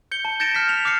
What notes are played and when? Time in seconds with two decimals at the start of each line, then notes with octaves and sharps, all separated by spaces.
0.11 G6 C#7 G7
0.25 A5
0.40 G6 A6 A#6 C#7 D7 E7
0.55 F6 G6 B6
0.69 F7
0.85 D6 F6 G6 C7 C#7